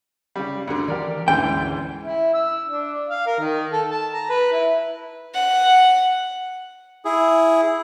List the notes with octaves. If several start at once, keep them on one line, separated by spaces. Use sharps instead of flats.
C#3 G3
D2 D3
D#3 E3 G4 A#4 D5
D2 G#2 D3 E3 C#4 G5
E4
E6
D4
F5
A#4
D#3
A4
A5
A#5
B4
E4
F#5
E4 G#4